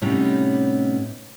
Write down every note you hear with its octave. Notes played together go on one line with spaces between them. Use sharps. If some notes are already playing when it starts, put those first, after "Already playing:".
A2 C3 G3 B3 C#4 D#4